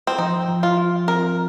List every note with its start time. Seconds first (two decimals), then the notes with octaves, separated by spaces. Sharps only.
0.07 C4
0.18 F3 D#4
0.48 F3
0.63 F4
0.77 F4
1.08 C4 A#4